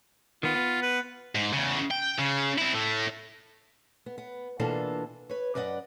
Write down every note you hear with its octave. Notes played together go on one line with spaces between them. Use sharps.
D#3 B3 F4
B3
B4
G#2
E2 C#3
G5
C#3
C4 E4
A2 A3
B3
B3
B2 E3 A#3 D4 F4 A4
B4 C#5
F#2 B4 D5 D#5 F#5